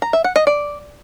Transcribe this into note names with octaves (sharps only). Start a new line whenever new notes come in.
A#5
E5
F#5
D#5
D5